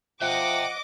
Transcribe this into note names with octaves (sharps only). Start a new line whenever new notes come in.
F3 D#5 E5 F#5 G5 D6